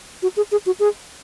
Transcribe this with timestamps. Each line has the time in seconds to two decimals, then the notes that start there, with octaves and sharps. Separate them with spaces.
0.23 F#4
0.37 G#4
0.52 G#4
0.66 F#4
0.80 G#4